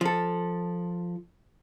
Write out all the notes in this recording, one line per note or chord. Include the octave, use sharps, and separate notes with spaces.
F3 A4